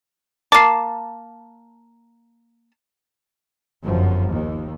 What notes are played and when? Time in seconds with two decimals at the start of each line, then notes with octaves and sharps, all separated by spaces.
0.52 A#3 A5 D6 C7
3.85 G1 F#2 F3
4.31 D#2